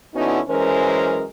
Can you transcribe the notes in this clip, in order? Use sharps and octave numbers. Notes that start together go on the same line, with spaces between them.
D3 B3 C#4 D#4 E4 F#4
F#2 E3 G#3 C#4 A#4 C5